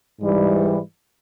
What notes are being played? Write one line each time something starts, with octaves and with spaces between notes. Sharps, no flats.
G#2 E3 G3